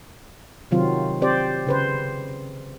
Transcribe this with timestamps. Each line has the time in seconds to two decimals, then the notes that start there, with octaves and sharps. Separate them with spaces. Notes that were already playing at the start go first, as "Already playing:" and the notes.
0.71 C3 D#3 F#3 C4 F4
1.22 C4 G4 C5 D5
1.67 C#3 B4 C5